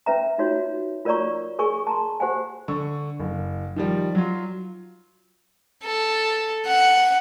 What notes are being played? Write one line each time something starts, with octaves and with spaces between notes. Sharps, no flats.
C#4 B4 E5 A#5
D#4 F4 F#4 C#5
F4 A#4 C#5 D5 A#5 C#6
G4 G#4 A#4 G#5 C#6
A5 A#5 C6
G4 C5 F#5 G#5
D3 C#6
F#1
D#3 F3 G3
F#3 F4
A4
F#5